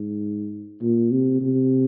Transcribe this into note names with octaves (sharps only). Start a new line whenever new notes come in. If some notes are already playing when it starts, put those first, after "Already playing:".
Already playing: G#2
A#2
C3
C3